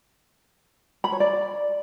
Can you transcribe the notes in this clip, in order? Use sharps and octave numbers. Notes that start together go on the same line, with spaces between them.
B5
C#5
D5